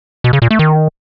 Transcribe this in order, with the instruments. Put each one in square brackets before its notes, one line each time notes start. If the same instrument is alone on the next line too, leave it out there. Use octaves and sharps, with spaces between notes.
[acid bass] B2
C#3
A#2
A3
D#3